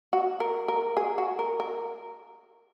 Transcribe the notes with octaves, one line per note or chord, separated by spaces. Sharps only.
F#4
A#4
A#4
G#4
F#4
A#4
A#4